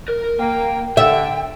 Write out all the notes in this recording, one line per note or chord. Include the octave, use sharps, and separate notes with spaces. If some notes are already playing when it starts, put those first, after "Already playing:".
A#4
A#3 G5
D3 E5 G5